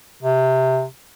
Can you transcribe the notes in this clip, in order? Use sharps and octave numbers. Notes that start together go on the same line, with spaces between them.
C3